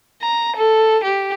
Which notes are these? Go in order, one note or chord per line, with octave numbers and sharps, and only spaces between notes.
A#5
A4
G4